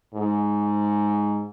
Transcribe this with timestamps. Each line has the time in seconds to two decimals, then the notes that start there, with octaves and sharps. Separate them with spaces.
0.14 G#2